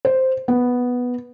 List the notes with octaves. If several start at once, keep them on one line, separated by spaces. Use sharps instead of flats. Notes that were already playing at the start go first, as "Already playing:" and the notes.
C5
B3